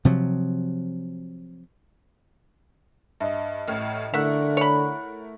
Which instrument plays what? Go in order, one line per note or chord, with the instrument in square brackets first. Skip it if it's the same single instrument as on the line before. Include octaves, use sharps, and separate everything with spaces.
[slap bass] C3 F3 F#3
[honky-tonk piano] G2 [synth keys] D#5 E5
[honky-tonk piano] A1 A2 F6
[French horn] D3 [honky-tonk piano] A3 E4 A#4 [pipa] E5 [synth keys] F#5 C#6 F#6
[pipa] C#5 B5